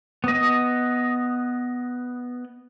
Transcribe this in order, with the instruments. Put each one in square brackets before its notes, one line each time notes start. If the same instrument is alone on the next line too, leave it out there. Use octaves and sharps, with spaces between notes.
[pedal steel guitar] B3 D#5